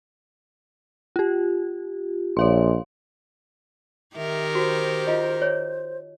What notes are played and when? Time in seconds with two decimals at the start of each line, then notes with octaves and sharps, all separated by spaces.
1.16 F4 G4
2.37 A#1 C#5 F5 C6
4.15 D#3 G4 A#4 E5
4.55 F#4 C5
5.07 F4 D#5
5.42 C#5